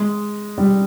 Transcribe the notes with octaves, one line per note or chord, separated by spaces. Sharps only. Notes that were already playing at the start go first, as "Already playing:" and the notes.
Already playing: G#3
G3